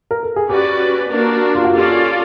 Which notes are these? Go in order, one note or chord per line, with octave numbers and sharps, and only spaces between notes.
A#4
A4
G#4
C#4 F#4 G4 B4 D5
A#3 D4 F#4 A#4
F4
F#4
C#4 F4 G4 A4 D5